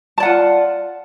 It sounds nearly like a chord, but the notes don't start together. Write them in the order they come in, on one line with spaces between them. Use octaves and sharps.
A5 D5 F#5 F4